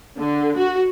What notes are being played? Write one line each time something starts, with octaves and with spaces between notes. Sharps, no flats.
D3
F#4